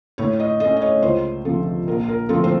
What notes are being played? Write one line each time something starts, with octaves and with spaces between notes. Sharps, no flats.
A2 C#5
D#5
A3 C#4 D#5
D#5
C#5
C#2 C5
C3 F3 A4
A#1 A#4
A#4
A2 F3 A3 C4 A4
C5